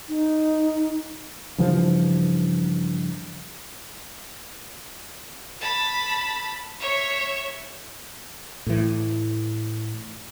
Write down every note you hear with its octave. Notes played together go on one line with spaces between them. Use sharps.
D#4
G2 C#3 E3 F3
A5 B5
C#5 E5
A2 E3